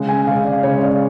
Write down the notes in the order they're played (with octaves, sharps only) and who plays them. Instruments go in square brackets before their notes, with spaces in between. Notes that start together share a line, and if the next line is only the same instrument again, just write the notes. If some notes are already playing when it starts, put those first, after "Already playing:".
Already playing: [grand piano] C#3 G#3
G#5
C#3 G#3 F5
D5
C#3 G#3 C#5
D5